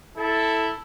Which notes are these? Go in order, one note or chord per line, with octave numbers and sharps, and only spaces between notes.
E4 A4